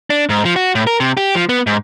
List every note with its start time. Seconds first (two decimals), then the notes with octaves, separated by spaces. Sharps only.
0.10 D4
0.29 G#2
0.45 F3
0.56 F#4
0.75 A2
0.87 A#4
1.00 C3
1.17 G4
1.35 F3
1.49 B3
1.67 G#2